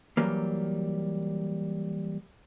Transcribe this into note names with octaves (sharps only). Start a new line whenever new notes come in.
E3 F#3 G3 A#3